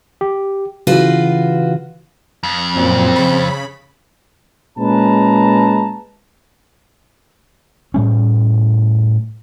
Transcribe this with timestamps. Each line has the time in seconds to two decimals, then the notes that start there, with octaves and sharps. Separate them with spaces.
0.21 G4
0.87 C#3 E3 F4 F#4 B4
2.43 F2
2.76 F#2 A#2 C4
3.16 C#3 B5
4.77 A#2 G#3 C#4 B4 A5 A#5
7.94 A2 G3 C#4